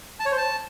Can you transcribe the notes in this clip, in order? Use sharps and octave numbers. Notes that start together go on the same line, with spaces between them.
A5
C#5
C5
A5